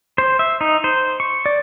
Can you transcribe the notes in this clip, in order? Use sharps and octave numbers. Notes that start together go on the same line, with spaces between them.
C5
E5
D#4
C5
C#6
D5